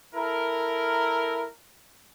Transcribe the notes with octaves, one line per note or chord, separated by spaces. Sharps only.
E4 A4 A#4